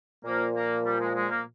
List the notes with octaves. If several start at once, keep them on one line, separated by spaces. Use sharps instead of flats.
A#2 F3 A#3
A#3
G3
G#3
G#3
A#3